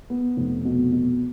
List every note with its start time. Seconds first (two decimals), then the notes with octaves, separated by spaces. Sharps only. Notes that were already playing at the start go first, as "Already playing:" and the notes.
0.10 B3
0.37 F1
0.65 B2
0.92 B2